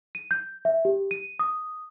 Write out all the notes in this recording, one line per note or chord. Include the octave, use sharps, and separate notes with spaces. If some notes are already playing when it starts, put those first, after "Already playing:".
D#7
G6
E5
G4
D#7
D#6